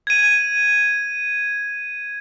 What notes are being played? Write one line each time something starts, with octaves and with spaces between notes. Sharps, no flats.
G#6 D#7